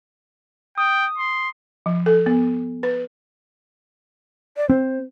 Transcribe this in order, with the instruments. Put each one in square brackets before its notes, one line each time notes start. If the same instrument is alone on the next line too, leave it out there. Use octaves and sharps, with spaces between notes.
[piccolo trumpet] G5 [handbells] D#6
[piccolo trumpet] C6
[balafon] F3
A4
B3
B4
[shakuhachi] D5
[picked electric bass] C4 [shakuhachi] C5